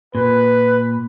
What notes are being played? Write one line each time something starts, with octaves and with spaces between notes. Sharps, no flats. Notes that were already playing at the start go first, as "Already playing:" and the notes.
A#2 B4